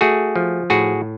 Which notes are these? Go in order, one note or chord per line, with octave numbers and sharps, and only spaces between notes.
A3 F#4 G#4
F3
A2 F#4 G#4